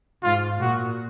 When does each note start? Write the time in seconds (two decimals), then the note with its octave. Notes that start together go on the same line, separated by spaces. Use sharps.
0.22 G#2 F4
0.60 A#2 F#4